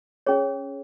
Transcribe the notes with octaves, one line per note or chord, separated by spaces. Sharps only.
C#4 G#4 C#5